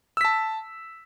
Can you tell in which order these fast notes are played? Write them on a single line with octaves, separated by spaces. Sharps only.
E6 B6 A5